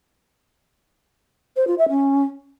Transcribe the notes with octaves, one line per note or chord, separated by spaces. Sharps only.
C5
F4
E5
C#4